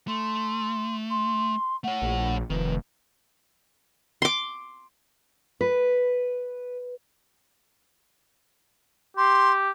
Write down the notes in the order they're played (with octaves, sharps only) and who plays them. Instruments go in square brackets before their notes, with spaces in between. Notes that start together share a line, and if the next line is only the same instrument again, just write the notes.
[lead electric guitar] A3 [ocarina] C6
[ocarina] C6
[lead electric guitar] A3 C#5 [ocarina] F#5
[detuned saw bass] A#1
[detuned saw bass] F1 [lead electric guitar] D#3 [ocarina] B4
[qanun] C6 D6
[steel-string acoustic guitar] B4
[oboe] G4 [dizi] C6